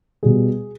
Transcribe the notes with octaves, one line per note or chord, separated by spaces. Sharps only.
B2 G3 G#4